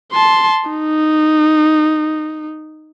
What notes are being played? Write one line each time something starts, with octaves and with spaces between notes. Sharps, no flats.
A5 C6
D#4